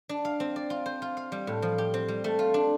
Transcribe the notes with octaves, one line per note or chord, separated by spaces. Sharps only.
D4
F5
C4
D5
F4
C5
F4
F5
G3
A2
F3
G4
C4
G3
A3
F4
D4